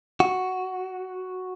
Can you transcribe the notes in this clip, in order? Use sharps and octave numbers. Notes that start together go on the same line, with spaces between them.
F#4